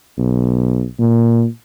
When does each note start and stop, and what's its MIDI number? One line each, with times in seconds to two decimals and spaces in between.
0.18 0.85 35
0.99 1.46 46